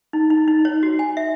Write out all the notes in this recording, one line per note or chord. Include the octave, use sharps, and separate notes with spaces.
D#4
D#4
D#4
C#5
F#4
G#5
E5